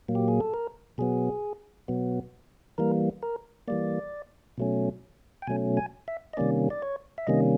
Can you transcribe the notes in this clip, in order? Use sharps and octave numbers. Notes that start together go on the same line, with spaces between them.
A#2 F#3 A#3
G4
G#4
A4
A#4
B2 F#3 B3 G#4
B2 F#3 B3
E3 G3 A#3 A#4
A#4
E3 G3 A#3 D5
B2 F#3 A3 C#4
G5
B2 F#3 A3 C#4 G#5
G#5
E5
D#5
C3 D#3 G3 A#3 C#4 D5
D5
C#5
E5
C3 D#3 G3 A#3 C#4 D#5